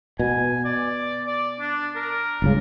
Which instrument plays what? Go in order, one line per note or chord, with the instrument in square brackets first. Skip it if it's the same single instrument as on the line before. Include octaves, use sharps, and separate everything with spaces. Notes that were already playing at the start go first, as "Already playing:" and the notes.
[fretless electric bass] B2 [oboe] G#5
[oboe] D5
D5
D4
A#4
[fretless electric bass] G1 C#2 C#3